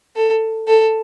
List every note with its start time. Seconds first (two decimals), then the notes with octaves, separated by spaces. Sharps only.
0.16 A4
0.68 A4